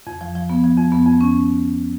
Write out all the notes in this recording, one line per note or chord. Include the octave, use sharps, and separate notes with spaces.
F2
F3
F3
B3
F3
F2
B3
F2
C#4